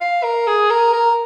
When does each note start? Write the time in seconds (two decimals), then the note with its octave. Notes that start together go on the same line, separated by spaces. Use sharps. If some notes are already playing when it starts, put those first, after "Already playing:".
0.01 F5
0.24 A#4
0.47 G#4
0.70 A#4
0.93 A#4